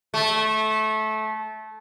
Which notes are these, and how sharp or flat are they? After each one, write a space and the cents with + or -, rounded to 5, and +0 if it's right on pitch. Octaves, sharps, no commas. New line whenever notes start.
A3 -20